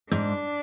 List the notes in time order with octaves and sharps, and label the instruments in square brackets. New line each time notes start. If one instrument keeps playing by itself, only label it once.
[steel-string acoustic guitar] G#2 [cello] D4